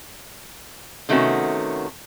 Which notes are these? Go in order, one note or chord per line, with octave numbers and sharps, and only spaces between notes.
C3 D#3 A3 B3 C#4 F#4